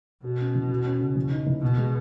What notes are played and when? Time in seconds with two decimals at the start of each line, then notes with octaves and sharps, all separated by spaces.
0.24 B2 F#4
0.40 C#4
0.55 E3
0.70 F#4
0.85 C#4
1.01 C#3
1.16 E3
1.31 D#4
1.46 E3
1.62 B2 B3
1.78 G#3